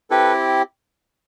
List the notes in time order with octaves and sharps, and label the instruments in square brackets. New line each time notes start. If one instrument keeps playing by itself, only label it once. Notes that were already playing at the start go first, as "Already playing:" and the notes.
[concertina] C4 E4 G4 A4 B4